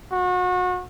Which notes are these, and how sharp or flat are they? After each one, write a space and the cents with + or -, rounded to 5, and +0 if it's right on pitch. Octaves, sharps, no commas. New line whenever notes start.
F#4 -30